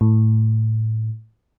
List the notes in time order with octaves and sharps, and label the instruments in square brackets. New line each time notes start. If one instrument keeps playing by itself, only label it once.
[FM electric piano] A2